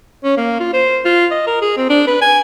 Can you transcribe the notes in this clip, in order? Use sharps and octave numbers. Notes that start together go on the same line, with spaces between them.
C#4
A#3
F4
C5
F4
D#5
A#4
G#4
C4
D4
B4
G#5